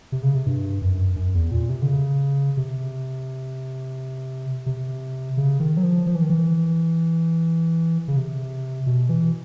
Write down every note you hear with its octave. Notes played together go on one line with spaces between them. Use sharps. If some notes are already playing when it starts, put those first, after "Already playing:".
C3
C#3
C3
G2
F#2
F#2
E2
A#2
C3
D3
C#3
C3
C3
C#3
D#3
F#3
F3
F3
E3
D#3
E3
C#3
C3
B2
E3